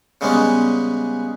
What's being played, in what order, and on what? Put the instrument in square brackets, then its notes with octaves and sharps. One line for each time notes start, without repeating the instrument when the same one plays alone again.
[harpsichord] C#3 G3 G#3 B3 C#4